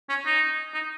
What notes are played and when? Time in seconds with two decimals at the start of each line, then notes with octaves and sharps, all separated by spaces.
0.09 C#4
0.26 D#4
0.74 D#4